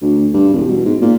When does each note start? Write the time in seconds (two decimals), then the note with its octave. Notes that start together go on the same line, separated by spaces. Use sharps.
0.02 D2
0.33 G2
0.53 E1
0.68 B2
0.85 G#2
1.01 A#2